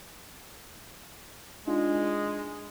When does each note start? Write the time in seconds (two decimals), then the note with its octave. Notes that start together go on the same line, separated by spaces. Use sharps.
1.67 G#3 D4 D#4 F4